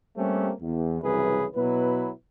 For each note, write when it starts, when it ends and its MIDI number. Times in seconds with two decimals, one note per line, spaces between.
0.17 0.51 55
0.17 0.51 57
0.17 0.51 58
0.17 0.51 60
0.17 0.51 61
0.17 0.51 67
0.61 1.02 40
1.02 1.46 36
1.02 1.46 42
1.02 1.46 49
1.02 1.46 52
1.02 1.46 68
1.02 1.46 71
1.55 2.11 47
1.55 2.11 54
1.55 2.11 64
1.55 2.11 71